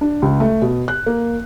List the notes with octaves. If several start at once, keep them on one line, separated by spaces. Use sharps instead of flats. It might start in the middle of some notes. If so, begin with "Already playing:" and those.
D4
C#2
A3
B2
F#6
A#3